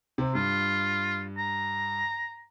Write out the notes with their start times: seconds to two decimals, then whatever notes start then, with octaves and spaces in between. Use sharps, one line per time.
0.18 C3 C4
0.35 G2 F4
1.38 A#5